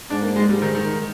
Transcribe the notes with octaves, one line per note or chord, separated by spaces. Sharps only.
G#2 D4
A#3
G#3
G#2 G3
D#3
D#3